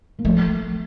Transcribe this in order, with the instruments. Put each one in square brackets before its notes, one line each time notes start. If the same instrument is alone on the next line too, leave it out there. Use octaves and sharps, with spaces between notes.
[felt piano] A#3
[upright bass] F3 [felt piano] A3